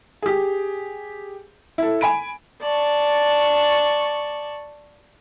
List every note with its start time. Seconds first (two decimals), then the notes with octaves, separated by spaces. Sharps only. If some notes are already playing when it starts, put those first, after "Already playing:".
0.22 G4 G#4
1.78 E4 A4
2.01 G#5 B5 D7
2.62 D5 A5 C#6